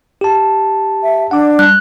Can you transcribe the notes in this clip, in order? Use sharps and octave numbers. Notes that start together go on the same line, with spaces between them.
G4 A5
E5
D4 F#5 D6
G3 F#6